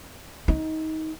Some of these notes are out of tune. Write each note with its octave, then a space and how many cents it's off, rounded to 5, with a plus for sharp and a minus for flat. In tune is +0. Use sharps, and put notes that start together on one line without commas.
D#4 +20